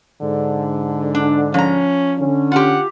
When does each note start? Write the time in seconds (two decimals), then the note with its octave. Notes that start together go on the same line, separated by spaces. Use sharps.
0.22 G#2 D3
1.15 D4
1.54 F3 C#4 A#5
2.19 D3 C#4
2.52 F4 G4 F#5